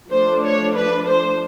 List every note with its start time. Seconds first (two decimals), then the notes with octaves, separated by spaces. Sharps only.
0.11 F3 A3 D4 C5
0.43 C#5
0.75 B4
1.06 C5